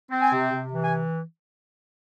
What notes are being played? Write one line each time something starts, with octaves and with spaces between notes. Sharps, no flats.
C4
G#5
C3
C3
E3
G#5